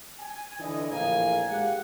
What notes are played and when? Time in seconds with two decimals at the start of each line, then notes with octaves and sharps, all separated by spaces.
0.20 G#5
0.59 D3 E3 D#5
0.90 A#1 A2 E3 F5 G#5 A#5
1.48 G#3 G4 F5 F#5